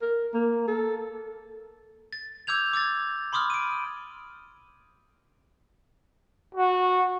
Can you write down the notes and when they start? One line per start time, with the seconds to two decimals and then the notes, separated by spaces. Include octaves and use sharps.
0.02 A#4
0.34 A#3
0.68 A4
2.13 A6
2.47 D6 E6 G6 G#6 F7
2.73 D6 E6 G#6 A6
3.33 B5 C6 D6 D#6 F6
3.50 D7 D#7
6.55 F#4